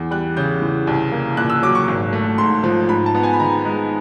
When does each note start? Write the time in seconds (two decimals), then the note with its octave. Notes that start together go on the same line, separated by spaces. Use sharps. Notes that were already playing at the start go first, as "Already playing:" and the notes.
Already playing: E2
0.11 G3 F#6
0.37 C#3 G6
0.62 E3
0.87 C2
1.12 A#3
1.37 A#2 F#6
1.50 E6
1.63 F#3 D6
1.75 C#6
1.88 G#1
2.13 A3
2.38 G#2 C6
2.64 F3
2.89 G#2 B5
3.06 A5
3.15 B3
3.23 G#5
3.33 B5
3.40 D#3 A#5
3.65 G#3